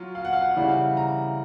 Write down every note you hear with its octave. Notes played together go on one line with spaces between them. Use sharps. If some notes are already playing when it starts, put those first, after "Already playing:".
Already playing: F#3 F4
F5
F#5
F5
F#5
F5
C#3 E3 G3 F#5
F5
A#5